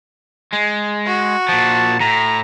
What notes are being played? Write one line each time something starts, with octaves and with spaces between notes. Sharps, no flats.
G#3
F#4
A#2 F3 A5
A2 A#5